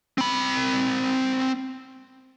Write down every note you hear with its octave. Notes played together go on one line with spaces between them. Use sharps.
C4 B5